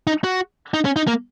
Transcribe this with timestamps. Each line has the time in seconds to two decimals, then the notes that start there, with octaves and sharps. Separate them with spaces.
0.07 D#4
0.24 F#4
0.74 D#4
0.85 C#4
0.96 D#4
1.07 A#3